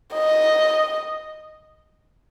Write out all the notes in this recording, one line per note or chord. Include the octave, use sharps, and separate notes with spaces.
D#5